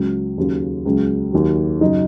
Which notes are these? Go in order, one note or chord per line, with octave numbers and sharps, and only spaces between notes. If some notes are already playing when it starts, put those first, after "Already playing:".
Already playing: C#2 C#3 F#3
D#2 C#3 F#3
C#2 C#3 F#3
D#2 D#3 F#3
F#2 C#3 F#3 D#4